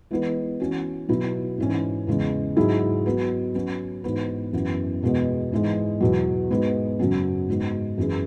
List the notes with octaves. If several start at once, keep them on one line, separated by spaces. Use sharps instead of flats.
E3 G#3 B3 E4 B4
E3 C#4 F#4
B2 F#3 E4 B4
G#2 E3 C#4
E2 C#3 G#3
G#2 F#3 E4 G#4
F#3 B3 F#4 B4
F#3 C#4 F#4 B4
G#2 E3 B3 F#4 B4
F#2 E3 B3
E2 B2 G#3 B3
G#2 E3 G#3
E2 B2 F#3
G#2 G#3 B3 F#4 B4
F#2 C#3 F#3 C#4
G#2 G#3 B3 F#4 B4
F#2 E3 C#4 G#4 B4